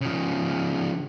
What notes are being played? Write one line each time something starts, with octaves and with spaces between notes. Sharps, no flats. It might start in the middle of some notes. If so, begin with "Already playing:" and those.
C#3 F3